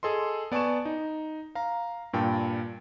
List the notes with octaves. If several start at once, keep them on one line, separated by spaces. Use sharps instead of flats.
G#4 A4 D#5 C6
B3 D5 G#5 A5 C#6 E7
D#4
F5 A#5
G2 A#2 G5 A5